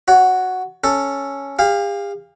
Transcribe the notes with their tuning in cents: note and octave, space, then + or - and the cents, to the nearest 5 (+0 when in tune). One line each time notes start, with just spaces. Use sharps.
F#4 +0 C#5 +35
C#4 +0 A4 +5
G4 +45 F5 +0